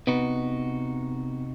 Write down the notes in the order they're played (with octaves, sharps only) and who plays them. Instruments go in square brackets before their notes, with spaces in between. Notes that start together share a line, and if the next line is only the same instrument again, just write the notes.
[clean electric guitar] C3 D#4 F#4 [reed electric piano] B3